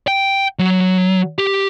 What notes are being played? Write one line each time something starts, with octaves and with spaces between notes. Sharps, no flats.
G5
F#3
G4